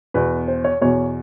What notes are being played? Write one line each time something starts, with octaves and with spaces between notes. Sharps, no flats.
E2 B2 B4
C5
C#5
E2 B2 C#5